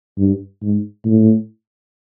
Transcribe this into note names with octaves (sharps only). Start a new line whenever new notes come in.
G2
G#2
A2